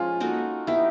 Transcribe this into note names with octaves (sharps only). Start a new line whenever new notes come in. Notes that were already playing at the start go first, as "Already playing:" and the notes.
Already playing: F3 G#3 C#4 F4
A#3 D#4 F#4 A4
B3 D#4 E4 G4